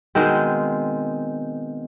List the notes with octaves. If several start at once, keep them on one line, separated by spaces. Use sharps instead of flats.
B2 D#3 G#3 C4